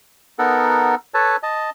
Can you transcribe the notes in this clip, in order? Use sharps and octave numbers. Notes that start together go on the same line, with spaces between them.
B3 D#4 A4 A#4 F#5
A4 B4 C#5 A5
D#5 A5